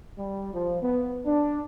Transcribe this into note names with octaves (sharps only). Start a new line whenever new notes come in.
G3
F3
B3
D4